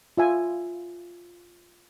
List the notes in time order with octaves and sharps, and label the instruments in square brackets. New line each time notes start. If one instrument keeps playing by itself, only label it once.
[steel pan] F4 E5 G#5